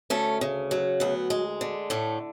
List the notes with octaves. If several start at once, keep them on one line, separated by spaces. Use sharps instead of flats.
D2 A3 C#4
C#3
F#3
D2 B3
G#3
D3
A2 A3